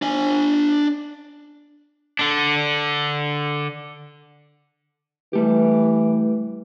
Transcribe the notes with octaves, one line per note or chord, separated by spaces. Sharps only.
D4 G#5
D3 D4
E3 G3 A3 G4